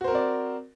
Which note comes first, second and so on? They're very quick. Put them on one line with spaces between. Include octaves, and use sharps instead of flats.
F#4 C5 A#4 C4 D5